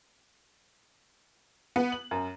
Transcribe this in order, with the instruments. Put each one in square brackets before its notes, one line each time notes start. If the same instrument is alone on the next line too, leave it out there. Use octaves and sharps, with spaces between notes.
[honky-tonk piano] B3
F#7
F#2